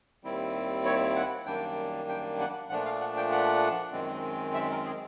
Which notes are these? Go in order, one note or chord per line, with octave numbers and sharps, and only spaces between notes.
D#2 D#3 G3 C4 E4
C#5
F#5
F#2 D#3 G3 A#3 D4 G5
G5
F#5
A#2 F3 A3 D4 F#5
F5
F#5
G5
F#5
F#2 D#3 G#3 C4
E5
A#4
G#4